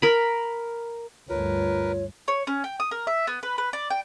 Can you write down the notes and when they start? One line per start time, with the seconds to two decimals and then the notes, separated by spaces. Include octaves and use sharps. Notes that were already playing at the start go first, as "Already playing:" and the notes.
0.02 A#4 B5
1.29 D2 G2 F4 A#4 B4 C#5
2.28 C#5
2.47 C#4
2.64 G5
2.80 D#6
2.91 A#4
3.07 E5
3.27 B3
3.43 B4
3.58 B4
3.73 D5
3.90 G5